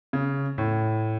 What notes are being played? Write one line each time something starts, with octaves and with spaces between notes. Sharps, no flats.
C#3
A2